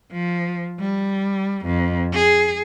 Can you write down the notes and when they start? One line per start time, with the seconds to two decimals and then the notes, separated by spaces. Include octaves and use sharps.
0.12 F3
0.80 G3
1.66 F2
2.13 G#4